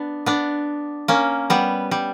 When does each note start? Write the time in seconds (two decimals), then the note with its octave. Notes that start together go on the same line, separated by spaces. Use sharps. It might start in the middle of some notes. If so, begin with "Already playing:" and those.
Already playing: B3 D4
0.26 B3 D4
1.08 A#3 C#4
1.50 G3 B3
1.91 G3